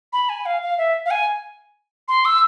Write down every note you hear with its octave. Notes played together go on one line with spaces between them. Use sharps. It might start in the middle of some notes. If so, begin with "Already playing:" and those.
B5
G#5
F5
F5
E5
F5
G#5
C6
E6